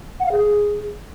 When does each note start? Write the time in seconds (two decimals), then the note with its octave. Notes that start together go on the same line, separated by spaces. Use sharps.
0.20 F#5
0.26 F5
0.32 G#4